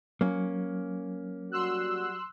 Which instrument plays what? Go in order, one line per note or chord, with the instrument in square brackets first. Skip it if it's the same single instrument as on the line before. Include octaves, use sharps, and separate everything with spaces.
[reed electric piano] F#3 [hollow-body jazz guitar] A#3 C#4
[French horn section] G3 F#4 [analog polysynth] C6 E6 F#6